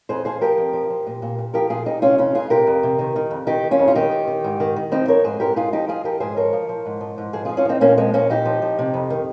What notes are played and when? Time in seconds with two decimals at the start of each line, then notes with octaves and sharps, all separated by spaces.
0.09 F2 G#4 C5
0.25 F3 G#4 C5
0.41 F3 G4 A#4
0.58 F2
0.73 F3
0.90 F3
1.07 A#2
1.22 A#2
1.38 A#2
1.54 F3 G4 A#4
1.70 A#2 F4 G#4
1.86 A#2 D#4 G4
2.02 C3 C#4 F4
2.18 F2 C#4 F4
2.35 F2 F4 G#4
2.50 C3 G4 A#4
2.67 F2
2.83 C3
2.99 D#3
3.16 D#3
3.31 F2
3.47 D#3 D#4 G4
3.63 D#3
3.71 C#4 F4
3.79 F2
3.88 F4
3.95 D#3 D#4 G4
4.11 D#3
4.28 D#3
4.44 G#2
4.60 D#3
4.76 D#3
4.91 F3 C4 D#4
5.08 F3 A#4 C#5
5.24 G#2 G#4 C5
5.40 G#2 G4 A#4
5.56 G#2 F4 G#4
5.73 F3 D#4 G4
5.88 F3 F4 G#4
6.04 F3 G4 A#4
6.20 G#2 G#4 C5
6.36 F3 A#4 C#5
6.53 F3
6.69 F3
6.86 G#2
7.01 F3
7.18 G#2
7.33 F3 G#4 C5
7.45 F3 F4 G#4
7.57 C#4 F4
7.65 F3 C4 D#4
7.81 A#2 A#3 C#4
7.97 F3 G#3 C4
8.14 A#2 A#3 C#4
8.30 A#2 D#4 G4
8.45 F3
8.62 F3
8.79 C3
8.94 F2
9.10 D#3